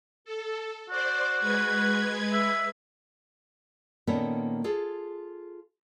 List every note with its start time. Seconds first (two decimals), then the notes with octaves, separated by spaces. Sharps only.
0.25 A4
0.90 F#4 C5 D5
1.40 G#3 B4 G#6
2.33 E5
4.07 A#2 D#3 A#3 B3 C#4 A4
4.64 F4 G#4 A4